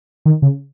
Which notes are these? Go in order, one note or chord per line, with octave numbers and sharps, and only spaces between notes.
D#3
C#3